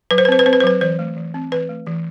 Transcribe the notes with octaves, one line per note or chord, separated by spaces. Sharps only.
F#3 B4
C5
B4
C4 C5
B4
C4 C5
B4
C5
F#3 B4
E3 C5
A3
E3
C4
E3 B4
A3
E3